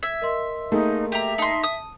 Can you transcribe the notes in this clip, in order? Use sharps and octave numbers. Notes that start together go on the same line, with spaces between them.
E5 G#6
A#4 D#5 C6
A3 A#3 D#4 G#4
G4 E5 A#5
D#4 A5 C6
D#6